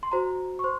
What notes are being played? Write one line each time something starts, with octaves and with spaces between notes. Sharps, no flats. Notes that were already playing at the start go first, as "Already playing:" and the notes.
C6
F#4 C5 A#5
C#6
C5 C6